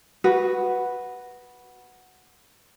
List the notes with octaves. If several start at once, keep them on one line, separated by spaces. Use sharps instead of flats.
F#4 B4